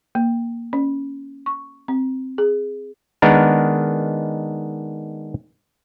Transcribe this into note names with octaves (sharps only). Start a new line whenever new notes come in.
A#3
C#4
C#6
C4
G#4
D#3 G#3 B3 D4 D#4 A#4